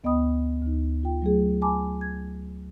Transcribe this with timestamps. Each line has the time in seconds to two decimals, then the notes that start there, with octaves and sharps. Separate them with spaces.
0.04 D2 B3 D#5 G5 B5 D#6
0.62 D2 D#4
1.03 F4 G5
1.22 F#3 A3 G#4
1.62 G#5 A5 B5 D6
2.01 G#6